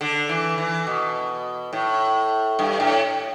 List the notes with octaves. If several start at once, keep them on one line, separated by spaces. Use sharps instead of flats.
D3
E3
E3
B2
A2
G2
A2